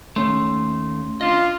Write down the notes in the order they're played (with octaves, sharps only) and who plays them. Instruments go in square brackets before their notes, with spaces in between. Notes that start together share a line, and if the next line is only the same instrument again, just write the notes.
[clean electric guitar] D#2 A3 [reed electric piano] C#4 C6
[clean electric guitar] D4 D#5 [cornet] F4